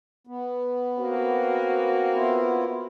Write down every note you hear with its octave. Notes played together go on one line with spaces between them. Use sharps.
B3
A#3 C4 F#4
B3 E4 F4